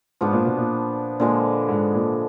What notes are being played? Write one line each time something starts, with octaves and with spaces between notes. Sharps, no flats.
G#2 F3 B3 D4
A#2
B2
A#2
A#2 D3 F3 G#3
G#2
A#2